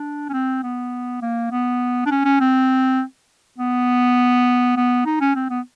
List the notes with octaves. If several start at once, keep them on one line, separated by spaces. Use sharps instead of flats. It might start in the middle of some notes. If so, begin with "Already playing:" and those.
Already playing: D4
C#4
C4
B3
A#3
B3
D4
C#4
C#4
C4
B3
B3
D#4
C#4
C4
B3